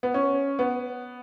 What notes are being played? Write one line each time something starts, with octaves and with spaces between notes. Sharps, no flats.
B3
C#4
B3